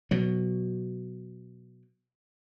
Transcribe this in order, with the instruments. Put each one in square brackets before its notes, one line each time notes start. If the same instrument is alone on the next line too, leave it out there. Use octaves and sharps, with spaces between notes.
[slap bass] B2 F#3